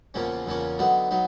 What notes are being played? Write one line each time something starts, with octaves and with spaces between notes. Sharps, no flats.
E2 C#3 F3 A#3 C#4
E2 C#3 F3 A#3 C#4
D3 F#3 B3 D#4
F#3 B3 D#4